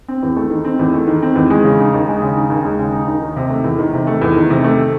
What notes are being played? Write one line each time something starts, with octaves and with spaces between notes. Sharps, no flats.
C4
E2
A3
D#3
C4
E2
A3
D#3
C4
E2
G#3
C#3
D#4
D#2
G#3
C#3
D#4
D#2
G#3
C#3
D#4
D#2
D#3
C3
A3
E2
D#3
C3
A3
E2
D#3
C3
A3